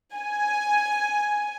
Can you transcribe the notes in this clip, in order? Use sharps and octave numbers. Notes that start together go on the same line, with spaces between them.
G#5